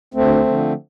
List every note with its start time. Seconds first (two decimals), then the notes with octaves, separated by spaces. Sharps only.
0.14 D2 A3 C4
0.47 D3 F3